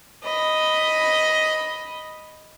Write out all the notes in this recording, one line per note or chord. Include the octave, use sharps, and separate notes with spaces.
D#5 B5